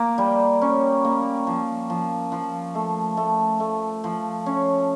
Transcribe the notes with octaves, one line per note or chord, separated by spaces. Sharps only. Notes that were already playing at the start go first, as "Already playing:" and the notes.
Already playing: A#3
G3
C#4
A#3
F3
F3
F3
A3
A3
A3
F3
C#4